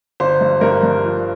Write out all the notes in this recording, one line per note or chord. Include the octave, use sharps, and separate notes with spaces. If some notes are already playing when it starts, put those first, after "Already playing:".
G1 C5
G2
G2 A#4
G2
F3